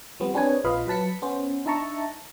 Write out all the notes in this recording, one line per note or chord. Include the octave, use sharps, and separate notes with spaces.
F3 G3 B3 C4
C4 D4 G#4 B4 C#5 G#5
A#1 F4 B4 D#5 F5 B5
F#3 B4 A5 B6 C#7
B3 C#4 C5
D4 D#4 E5 A5 A#5 C#6